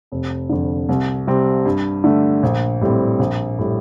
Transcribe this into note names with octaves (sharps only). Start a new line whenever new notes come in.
F1
F2 D3
C2
C3 G3 C4
G2
D3 A3
A#1
A2 G3 C4
A#1
A2 G3